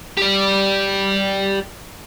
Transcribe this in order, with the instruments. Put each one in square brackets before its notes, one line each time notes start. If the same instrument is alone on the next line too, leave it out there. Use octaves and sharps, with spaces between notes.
[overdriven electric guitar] G4 D5